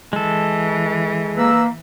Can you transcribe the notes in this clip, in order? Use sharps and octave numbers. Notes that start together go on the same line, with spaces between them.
E3 G#3 A4
A#3 B4 A#5 E6